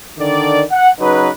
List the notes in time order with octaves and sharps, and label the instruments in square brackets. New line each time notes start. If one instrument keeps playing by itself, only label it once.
[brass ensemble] D3 D#3 D5
F#5
C#3 F#3 D#4 B4